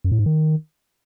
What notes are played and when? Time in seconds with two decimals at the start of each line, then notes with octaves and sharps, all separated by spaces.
0.04 F#2
0.12 A2
0.19 G#2
0.26 D#3